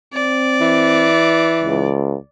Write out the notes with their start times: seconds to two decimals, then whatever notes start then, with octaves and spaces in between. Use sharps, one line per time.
0.14 C4 D5
0.61 E3
1.64 C#2